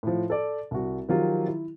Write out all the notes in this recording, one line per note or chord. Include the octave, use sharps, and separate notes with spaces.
A2 F3
A4 D5
C2 F#4
D#3 F3 F#3 F4 G4
E4